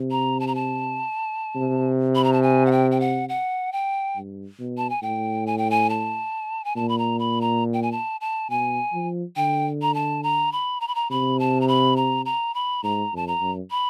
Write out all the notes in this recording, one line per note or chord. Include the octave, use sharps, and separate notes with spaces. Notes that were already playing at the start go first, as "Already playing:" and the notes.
Already playing: C3
A#5
A5
A#5
A5
C3
B5
A#5
A5
G#5
F#5
G5
G5
F#5
F#5
G5
G2
B2
A5
G#5
A2 G5
G#5
G5
G#5
A5
G#5
A#2 A5
B5
A#5
B5
A#5
G5
G#5
A5
A5
B2 G#5
F3
D3 G5
A#5
A5
A#5
B5
A#5
B5
A#5
C3 B5
A5
A#5
B5
A#5
A#5
B5
G#2 A#5
F2 A5
A#5
F#2
B5